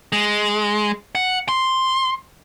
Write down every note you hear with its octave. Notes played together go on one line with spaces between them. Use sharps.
G#3
F#5
C6